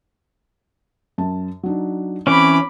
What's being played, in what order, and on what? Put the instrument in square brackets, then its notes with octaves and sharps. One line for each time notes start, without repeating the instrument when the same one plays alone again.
[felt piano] F#2 A5
F#3 D4 D#4
[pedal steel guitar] E3 C#4 [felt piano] C4 [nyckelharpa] B5 D6